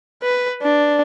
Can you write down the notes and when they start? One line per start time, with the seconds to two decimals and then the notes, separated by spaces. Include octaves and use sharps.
0.23 B4
0.62 D4